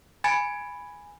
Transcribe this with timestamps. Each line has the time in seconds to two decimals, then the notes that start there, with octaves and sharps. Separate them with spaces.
0.24 G#5 B5 G#6 A6 C#7 D7